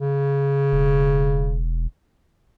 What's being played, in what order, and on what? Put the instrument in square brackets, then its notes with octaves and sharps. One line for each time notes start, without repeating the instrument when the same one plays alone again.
[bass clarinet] C#3
[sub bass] E1